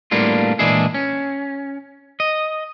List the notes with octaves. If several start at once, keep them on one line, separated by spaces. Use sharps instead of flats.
A2 G3 A#3 B3 D4 F4
A#2 E3 G#3 D4 E4 G#4
C#4
D#5